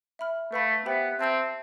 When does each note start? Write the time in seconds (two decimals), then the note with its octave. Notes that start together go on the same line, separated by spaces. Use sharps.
0.19 E5 B5 F6
0.52 A3 B4 F5 B5
0.86 B3 G4 C5 E5 G5 B5
1.19 C4 E5 A5 E6 G6